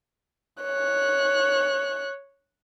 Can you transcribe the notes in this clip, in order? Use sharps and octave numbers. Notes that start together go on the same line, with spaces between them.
C#5 F#6